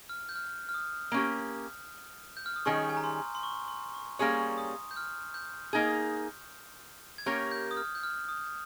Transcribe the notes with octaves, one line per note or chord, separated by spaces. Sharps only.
F6
G6
F6
F6
D#6
A#3 C#4 G4
G6
F6
D#6
D#3 G3 C#4 G#4 C#6
G#5
A#5
C6
C6
C#6
C6
C#6
G3 A#3 C#4 G#4 C#5 D#6
D#6
G6
F6
G6
A#3 D#4 G#4
G#6
A#3 C#4 G4 A#4 C#5 G6
G6
D#6
F6
G6
F6
D#6